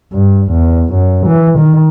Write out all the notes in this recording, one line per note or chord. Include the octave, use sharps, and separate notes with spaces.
G2
E2
F#2
E3
D#3